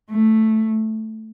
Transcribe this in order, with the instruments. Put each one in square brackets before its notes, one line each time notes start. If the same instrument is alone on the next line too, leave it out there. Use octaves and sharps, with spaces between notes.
[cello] A3